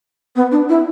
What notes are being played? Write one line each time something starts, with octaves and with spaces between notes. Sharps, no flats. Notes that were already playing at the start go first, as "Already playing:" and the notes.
B3
D4
E4